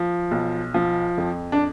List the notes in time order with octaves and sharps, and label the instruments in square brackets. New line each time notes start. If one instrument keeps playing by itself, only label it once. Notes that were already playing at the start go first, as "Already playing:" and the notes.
Already playing: [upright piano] F3
B1
F3
F2
D4